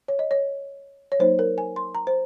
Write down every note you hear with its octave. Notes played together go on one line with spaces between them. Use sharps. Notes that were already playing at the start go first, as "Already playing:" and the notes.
C#5
D#5
C#5
C#5
F#3 A#3 D#4 C5
A#4
G#5
C6
A#5
C5